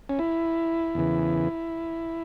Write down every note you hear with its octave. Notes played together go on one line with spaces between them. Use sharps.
C#4
E4
E2 C#3 E3